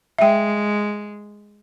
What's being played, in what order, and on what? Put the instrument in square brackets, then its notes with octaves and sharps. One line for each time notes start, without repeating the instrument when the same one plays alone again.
[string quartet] G#3 [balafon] E5 G5